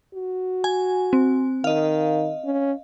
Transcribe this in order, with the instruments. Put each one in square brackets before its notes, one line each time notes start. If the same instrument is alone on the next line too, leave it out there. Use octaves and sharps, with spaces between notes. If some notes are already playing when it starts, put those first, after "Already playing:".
[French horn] F#4
[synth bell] G#5
C4
[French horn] D#3 [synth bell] D#5 F5
[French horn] C#4